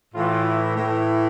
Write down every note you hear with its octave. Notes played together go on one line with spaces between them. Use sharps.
A2 E3 F4
E4
A2 E3